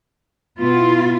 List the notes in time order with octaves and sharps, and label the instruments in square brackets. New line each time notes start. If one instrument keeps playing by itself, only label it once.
[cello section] B2 B3 E4 F4